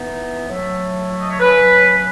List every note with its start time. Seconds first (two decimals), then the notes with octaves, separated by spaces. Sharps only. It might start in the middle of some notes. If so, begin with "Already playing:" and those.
Already playing: E3 B3 D#4
0.48 A2 F#3 A3
1.21 D#5
1.30 C#5
1.40 A2 F#3 C#4 B4